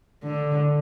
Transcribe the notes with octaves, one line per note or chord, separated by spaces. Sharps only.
D3